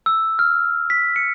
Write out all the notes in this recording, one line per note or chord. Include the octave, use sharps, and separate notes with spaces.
E6
F6
B6
C#7